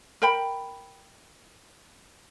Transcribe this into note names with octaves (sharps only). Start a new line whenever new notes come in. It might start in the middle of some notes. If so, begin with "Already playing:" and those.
A#4 G5 B5